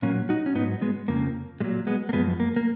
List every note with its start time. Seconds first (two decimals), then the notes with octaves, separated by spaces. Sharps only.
0.02 A#2 F#3 A#3 C#4
0.29 D#4 F#4
0.46 C#4
0.55 G#2 F#3 B3 D#4
0.81 G#3 B3
1.08 F2 C#3 F3 A#3
1.60 A#2 F#3 G#3
1.87 G#3 B3
2.09 A#3
2.13 F#2 F3 G#3 B3
2.40 A#3
2.56 A#3